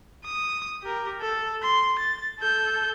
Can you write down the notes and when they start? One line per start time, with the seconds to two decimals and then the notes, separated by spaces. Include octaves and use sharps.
0.25 D#6
0.83 G4 A#4
1.21 A4
1.62 C6
1.99 A6
2.40 A4 G6